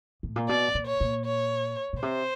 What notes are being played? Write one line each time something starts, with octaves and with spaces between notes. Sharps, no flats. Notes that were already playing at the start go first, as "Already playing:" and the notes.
A2
A#2
B2 D5
A#2
C#5
A#2
C#5
B2
C3 C5